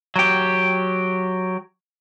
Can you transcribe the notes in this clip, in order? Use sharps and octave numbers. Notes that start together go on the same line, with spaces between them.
F#3 G4